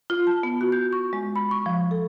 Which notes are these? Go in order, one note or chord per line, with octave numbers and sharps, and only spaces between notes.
F4
A5
B3
F#4
G6
C#6
G#3
B5
C#6
F3
A4